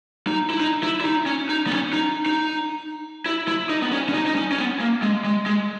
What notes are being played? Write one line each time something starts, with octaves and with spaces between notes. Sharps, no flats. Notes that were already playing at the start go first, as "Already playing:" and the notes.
D#4
E4
D#4
E4
E4
D#4
C#4
D#4
B3
C#4
D#4
D#4
E4
E4
D#4
B3
C#4
C#4
D#4
D#4
C#4
C#4
B3
A#3
G#3
G#3
G#3